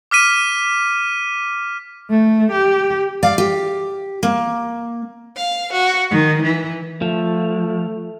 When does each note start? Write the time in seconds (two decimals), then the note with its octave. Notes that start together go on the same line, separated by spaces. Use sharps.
0.11 D6 F6 B6 D#7
2.10 A3
2.51 G4
3.23 D5 F5
3.38 G4
4.23 A#3
5.36 F5
5.72 F#4
6.11 D#3
6.42 E3
7.02 F3 A3